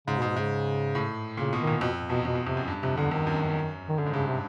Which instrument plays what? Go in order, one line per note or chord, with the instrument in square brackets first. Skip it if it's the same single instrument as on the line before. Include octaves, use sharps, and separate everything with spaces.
[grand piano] G#2 [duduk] C#3
[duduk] B2
[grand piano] G#2
[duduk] B2
[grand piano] G#2 [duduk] C#3
[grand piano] A2
[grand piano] A#2 [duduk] C#3
[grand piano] B2
[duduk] D#3
[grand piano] A#2
[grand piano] F2 [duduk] B2
[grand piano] E2 [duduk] B2
[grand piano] F2 [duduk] B2
[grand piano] E2
[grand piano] F2 [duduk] C3
[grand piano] F#2
G2
[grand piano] F2 [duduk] C3
[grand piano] E2 [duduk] D3
[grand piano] F2 [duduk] D#3
[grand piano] F#2
F#2
[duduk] D#3
[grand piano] F#2 [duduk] D3
[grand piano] G#2
[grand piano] G2 [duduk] C#3
[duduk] C3